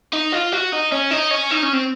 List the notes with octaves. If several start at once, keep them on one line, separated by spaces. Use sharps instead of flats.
D#4
F4
F#4
D#4
C#4
D#4
C#4
D#4
C#4
C4